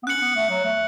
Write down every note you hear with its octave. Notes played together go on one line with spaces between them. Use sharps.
B3
C#4 F#6 C#7 F#7
C#4
B3
A3
F#3
A3